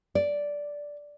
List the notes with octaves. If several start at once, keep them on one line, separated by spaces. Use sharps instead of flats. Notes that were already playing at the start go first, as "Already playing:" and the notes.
D5